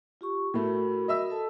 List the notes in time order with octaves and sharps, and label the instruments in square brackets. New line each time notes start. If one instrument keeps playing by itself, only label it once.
[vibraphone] F4 G4 C#6
[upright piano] A2 A3 [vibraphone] F#4 A#4 B5
[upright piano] D#5 E5 E6
[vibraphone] A4 A5